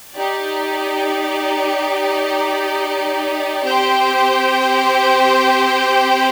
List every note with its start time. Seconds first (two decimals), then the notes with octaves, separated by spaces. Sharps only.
0.14 D#4 G4 D5
3.64 C4 G4 C5 G5